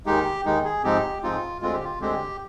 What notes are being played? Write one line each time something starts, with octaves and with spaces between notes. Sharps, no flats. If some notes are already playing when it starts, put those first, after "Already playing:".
D#2 D#3 G#3 D#4 G4
D#2 D#3 G#3 D#4
G#4
G#2 F3 G#3 C4 D#4 G4
G#2 F3 G#3 C4 D#4 F4
D2 D3 G#3 C4 F4
G4
F4
D2 D3 G#3 C4 G4